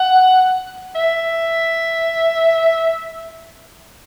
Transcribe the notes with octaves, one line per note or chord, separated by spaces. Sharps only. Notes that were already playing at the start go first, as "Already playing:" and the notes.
Already playing: F#5
E5